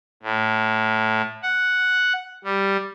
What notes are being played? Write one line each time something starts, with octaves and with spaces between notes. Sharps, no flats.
A2
F#5
G3